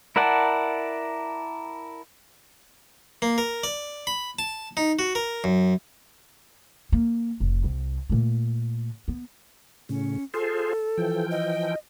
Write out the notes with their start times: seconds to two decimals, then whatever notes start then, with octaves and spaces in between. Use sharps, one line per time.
0.16 E4 A#4 D5 F#5 A5
3.22 A#3
3.38 A#4
3.64 D5
4.07 B5
4.39 A5
4.77 D#4
4.99 F#4
5.15 A#4
5.44 F#2
6.92 A#3
7.40 F1
7.64 C2
8.10 A#2 A3
9.08 B3
9.89 A2 C#3 C#4
10.34 F4 G#4 A4 C5
10.97 E3 F3 G5
11.31 D#5